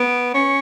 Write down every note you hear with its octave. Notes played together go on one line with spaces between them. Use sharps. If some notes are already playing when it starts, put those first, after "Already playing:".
Already playing: B3 D7
C#4 C#7